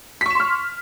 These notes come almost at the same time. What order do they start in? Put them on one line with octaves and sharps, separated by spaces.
B6 C#6 E7 C6 F6